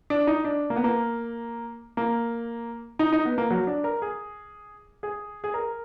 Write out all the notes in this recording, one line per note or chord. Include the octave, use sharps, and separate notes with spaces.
D4
D#4
D4
A#3
B3
A#3
A#3
D#4
D#4
B3
A#3
F#3
D4
A#4
G#4
G#4
G#4
A#4